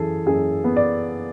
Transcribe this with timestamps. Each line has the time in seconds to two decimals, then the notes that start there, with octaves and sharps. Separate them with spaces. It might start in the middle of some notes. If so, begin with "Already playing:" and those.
Already playing: F#2 E3 G#4 A4
0.26 F#2 G#4
0.64 B3
0.77 D5